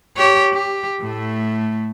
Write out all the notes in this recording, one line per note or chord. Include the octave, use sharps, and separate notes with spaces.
G4 C#5
G4
A2 A3